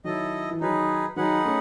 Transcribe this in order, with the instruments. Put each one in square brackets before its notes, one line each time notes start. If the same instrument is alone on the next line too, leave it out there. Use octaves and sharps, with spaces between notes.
[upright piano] D#3 F#3 [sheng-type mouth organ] E4 A4 D#5
[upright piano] E3
[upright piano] D#3 F#3 [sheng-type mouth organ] D#4 G#4 B4
[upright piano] D#3 F#3 [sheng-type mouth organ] D#4 G#4 B4 F#5
[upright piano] A3 C#4